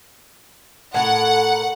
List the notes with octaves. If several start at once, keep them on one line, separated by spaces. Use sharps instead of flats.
A2 A#4 F#5